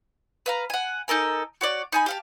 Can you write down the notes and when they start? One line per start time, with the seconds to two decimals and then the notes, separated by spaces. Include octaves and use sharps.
0.46 B4 F5 A#5
0.70 F#5 G#5
1.08 D#4 A4 A#4 G#5
1.61 F#4 C#5 D5
1.92 D#4 G#5 B5
2.06 G4 F5 A5